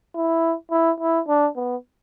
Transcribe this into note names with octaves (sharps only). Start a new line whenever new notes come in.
E4
E4
E4
D4
B3